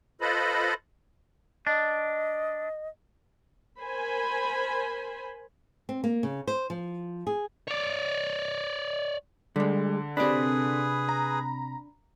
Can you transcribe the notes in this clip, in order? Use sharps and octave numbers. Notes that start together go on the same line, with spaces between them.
F4 A4 B4 C5 D#5 B5
D4 D#5
A#4 C5 G#5 B5
C4
A#3
C#3
C5
F3
G#4
C#5 D5
D3 G3 G#3
C3 D4 G#4 B4 D5 B5
A#5